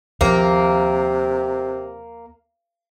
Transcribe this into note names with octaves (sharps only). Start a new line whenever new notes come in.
D#2 C3 F3 A#3